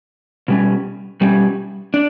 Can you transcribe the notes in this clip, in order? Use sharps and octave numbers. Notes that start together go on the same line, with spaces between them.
B2 G3 C#4
B2 G3 C#4
D4